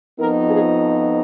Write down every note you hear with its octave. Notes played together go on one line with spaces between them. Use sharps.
F2 F3 B3 D#4 A#4
G#4